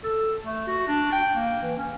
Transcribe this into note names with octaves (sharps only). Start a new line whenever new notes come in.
A4
A3
F#4
D4
G5
A#3
E3
C#4